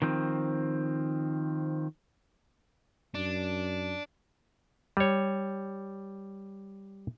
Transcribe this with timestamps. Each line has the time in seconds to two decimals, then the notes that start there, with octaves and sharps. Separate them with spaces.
0.02 D#3 F3 C4
3.15 F#2 D4
4.97 G3 C#5